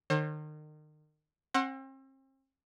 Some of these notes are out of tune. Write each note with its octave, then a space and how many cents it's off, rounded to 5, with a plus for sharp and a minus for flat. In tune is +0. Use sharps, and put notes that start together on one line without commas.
D#3 -35 C5 +45
C4 +40 F#5 +0 C6 +35